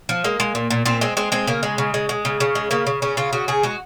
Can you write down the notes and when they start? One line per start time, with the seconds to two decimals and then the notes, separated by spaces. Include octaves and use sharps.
0.09 F3
0.24 G#3 A#3
0.40 G#3
0.55 A#2
0.70 A#2
0.85 A#2 C4
1.01 G#3 C4
1.17 G#3 C4
1.32 G#3 C4
1.47 C#3 A#3
1.63 G#3
1.78 C#3
1.94 G#3
2.09 G#3
2.25 C#3
2.40 C#3
2.55 G#3
2.71 C#3 A#3
2.87 C#3
3.02 C#3 C#4
3.17 C#3 F4
3.33 C#3 F#4
3.48 C#3 G#4
3.63 G#3 F#4